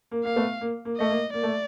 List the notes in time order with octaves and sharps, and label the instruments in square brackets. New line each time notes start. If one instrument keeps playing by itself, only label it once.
[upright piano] A#3
[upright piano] A#3 [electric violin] F5
[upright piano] A3 B3
A#3
A#3
[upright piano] A3 [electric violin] D#5
[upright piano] A#3
[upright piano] A#3 [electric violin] D5
[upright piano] A3